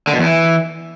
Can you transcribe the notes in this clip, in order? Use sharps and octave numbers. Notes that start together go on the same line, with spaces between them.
D3
B2
E2
E3